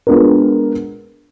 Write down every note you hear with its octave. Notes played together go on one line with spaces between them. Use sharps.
G#3 B3 D4 F4 A#4